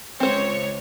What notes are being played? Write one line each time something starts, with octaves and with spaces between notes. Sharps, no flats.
C#2 C4 C5 C#5